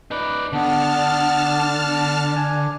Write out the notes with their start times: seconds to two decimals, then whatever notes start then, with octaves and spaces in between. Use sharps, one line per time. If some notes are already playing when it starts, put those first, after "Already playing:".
0.11 D#4 B4 D5
0.53 D3 B3 D4 A5 F6
2.35 G#5